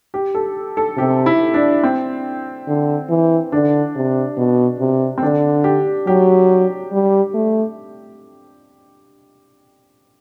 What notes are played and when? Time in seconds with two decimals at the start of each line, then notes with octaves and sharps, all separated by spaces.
0.14 G4
0.35 A4
0.77 A4
0.97 C3 G4
1.26 E4
1.54 D4
1.83 C4
2.68 D3
3.10 E3
3.52 D3 D4
3.96 C3
4.37 B2
4.79 C3
5.18 C4
5.23 D3 D4
5.64 G4
6.07 F#3 G4
6.92 G3
7.34 A3